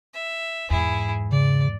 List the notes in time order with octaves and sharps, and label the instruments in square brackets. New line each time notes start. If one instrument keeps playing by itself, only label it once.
[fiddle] E5
[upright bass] E2 G#2 [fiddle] E4 G#4
[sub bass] C#3 [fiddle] D5